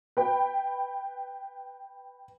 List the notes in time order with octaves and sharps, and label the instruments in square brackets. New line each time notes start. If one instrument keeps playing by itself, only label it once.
[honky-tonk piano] B4 G5 B5